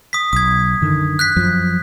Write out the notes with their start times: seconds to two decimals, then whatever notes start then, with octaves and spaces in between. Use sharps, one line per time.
0.13 D#6 B6
0.33 B1 D#6 G#6
0.81 F#2 D3 D#3
1.19 F#6 G6 B6
1.36 F#2 F3